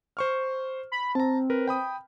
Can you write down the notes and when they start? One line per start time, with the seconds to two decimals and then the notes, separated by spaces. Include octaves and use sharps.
0.17 C5 C#6 F6
0.92 B5
1.15 C4 A5 A#5
1.50 A#4 B4
1.67 G5 B5 D#6